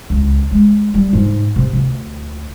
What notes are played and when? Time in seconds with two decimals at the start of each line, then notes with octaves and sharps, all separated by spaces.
0.10 C#2
0.51 G#3
0.94 G3
1.13 G#2
1.56 C3
1.73 D2